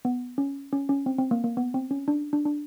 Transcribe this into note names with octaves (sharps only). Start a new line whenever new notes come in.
B3
C#4
C#4
C#4
C4
C4
A#3
A#3
B3
C4
C#4
D4
D4
D4